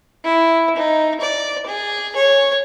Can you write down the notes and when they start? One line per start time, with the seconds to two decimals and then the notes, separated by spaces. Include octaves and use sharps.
0.24 E4
0.76 D#4
1.21 D5
1.67 G#4
2.16 C#5